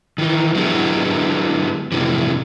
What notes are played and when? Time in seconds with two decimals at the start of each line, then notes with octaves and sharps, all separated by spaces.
0.18 D#3 E3
0.55 D3 F#3 G#3 B3 E4 G4
1.92 F2 A2 C3 E3